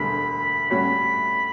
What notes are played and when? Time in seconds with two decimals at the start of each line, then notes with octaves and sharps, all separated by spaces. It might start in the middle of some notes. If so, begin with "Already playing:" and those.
Already playing: E1 D2 D3 G3 B5
0.70 A2 G3 C#4 F#4 C#5 B5